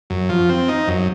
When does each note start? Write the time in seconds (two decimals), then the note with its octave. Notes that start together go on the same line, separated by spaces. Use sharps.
0.10 F#2
0.29 F3
0.49 C4
0.68 D#4
0.88 F#2